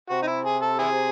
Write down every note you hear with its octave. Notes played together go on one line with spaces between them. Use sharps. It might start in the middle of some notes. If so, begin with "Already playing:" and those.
C3 F#4
D#4
E4
G#4
A4
E4 G#4